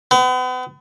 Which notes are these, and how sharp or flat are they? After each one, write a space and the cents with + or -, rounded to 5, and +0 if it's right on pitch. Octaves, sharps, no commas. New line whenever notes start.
B3 +40